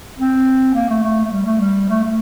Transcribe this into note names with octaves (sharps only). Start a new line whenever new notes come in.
C4
A#3
A3
A3
A3
G3
A3
G3
A3
A3